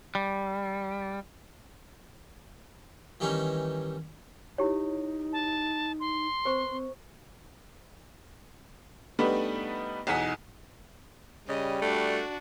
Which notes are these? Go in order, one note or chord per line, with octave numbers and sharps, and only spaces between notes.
G3
D#3 E3 G3 C#4 D#4
D#4 E4 G4 C#5
A5
C6
C4 B4 C5 C#6
C4
G3 A3 B3 D4 D#4 B4
B1 E2 D#4 F#5 G#5 B6
C#3 G3 D#5
A3 D4 F#4